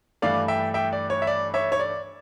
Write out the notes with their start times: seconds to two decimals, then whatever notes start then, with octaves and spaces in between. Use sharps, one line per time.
0.22 G2 E3 A3 D4 D5 F5
0.48 E5 G5
0.74 E5 G5
0.93 D5
1.10 C#5
1.22 E5
1.27 D5
1.54 C#5 E5
1.72 C#5
1.80 D5